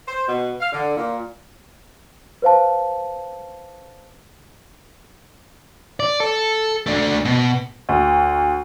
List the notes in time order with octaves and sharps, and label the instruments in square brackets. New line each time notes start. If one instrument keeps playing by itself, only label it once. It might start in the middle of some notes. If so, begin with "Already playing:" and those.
[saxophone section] C5
B2
F5
D3
A#2
[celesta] B4 C5 F5 A5
[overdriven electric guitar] D5
A4
A3 D4
B2
[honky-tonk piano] D2